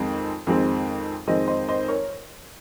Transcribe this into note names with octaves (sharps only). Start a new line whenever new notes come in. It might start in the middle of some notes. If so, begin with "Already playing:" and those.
Already playing: F2 D#3 G#3 C4
F2 D#3 G#3 C4
F2 D#3 G#3 C4 C5 D#5
C5 D#5
C5 D#5
A#4 C#5